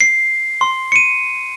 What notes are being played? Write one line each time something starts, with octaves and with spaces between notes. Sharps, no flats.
C7
C6
C#7 D#7